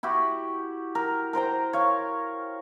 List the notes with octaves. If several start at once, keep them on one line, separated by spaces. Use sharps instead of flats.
E4 F#4 G4
A#4
A#4 C5 G5 A#5
C#5 F5